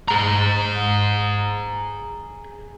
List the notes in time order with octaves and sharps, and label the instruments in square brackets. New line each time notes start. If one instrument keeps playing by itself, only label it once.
[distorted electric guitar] G#4 A#5